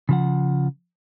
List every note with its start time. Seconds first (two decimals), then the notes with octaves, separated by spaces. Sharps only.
0.09 C#3 F3 F#5